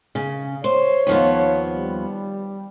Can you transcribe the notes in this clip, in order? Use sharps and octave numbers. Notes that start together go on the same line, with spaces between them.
C#3
C5 C#5
D#2 F3 B3
G3